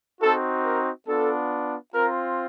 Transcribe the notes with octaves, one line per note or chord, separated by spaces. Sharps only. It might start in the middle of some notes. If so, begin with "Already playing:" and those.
C4 D#4 F#4 A4
A#4
B3 D4 F4 A4
C4 F4 A#4